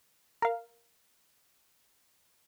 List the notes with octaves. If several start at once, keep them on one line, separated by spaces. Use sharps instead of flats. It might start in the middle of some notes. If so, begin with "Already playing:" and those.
A#4 F5